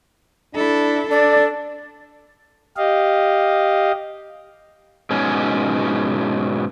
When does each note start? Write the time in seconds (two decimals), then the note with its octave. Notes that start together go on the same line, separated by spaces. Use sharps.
0.55 D4 E4 A4
1.11 D4 A4 D5
2.77 G4 D#5 F5
5.11 G#2 B2 C#4